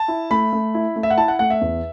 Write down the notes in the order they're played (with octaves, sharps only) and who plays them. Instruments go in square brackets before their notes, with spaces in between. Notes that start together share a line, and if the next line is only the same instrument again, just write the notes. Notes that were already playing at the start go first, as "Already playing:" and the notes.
Already playing: [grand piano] A5
E4
A3 B5
A3
E4
A3
E5
F#5
E4 A5
F#5
A3 F#5
E5
E2